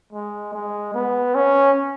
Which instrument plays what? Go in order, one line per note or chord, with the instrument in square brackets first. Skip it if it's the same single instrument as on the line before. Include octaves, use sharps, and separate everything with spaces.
[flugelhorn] G#3
G#3
B3
C#4